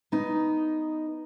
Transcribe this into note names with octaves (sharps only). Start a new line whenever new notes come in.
B3 D#4